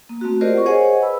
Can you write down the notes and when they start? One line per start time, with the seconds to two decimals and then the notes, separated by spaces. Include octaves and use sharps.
0.09 A#3
0.21 A3 C4 F#4
0.41 F4 G4 A#4 C5 D5 D#5
0.53 F#5 C#6
0.66 G#4 C5 C#5 D#5 F#5 G#5
1.02 B4 B5 E6